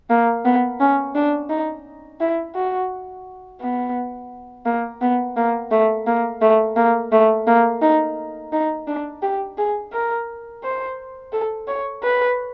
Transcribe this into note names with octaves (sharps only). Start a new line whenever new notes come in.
A#3
B3
C#4
D4
D#4
E4
F#4
B3
A#3
B3
A#3
A3
A#3
A3
A#3
A3
A#3
D#4
D#4
D4
G4
G#4
A#4
C5
A4
C#5
B4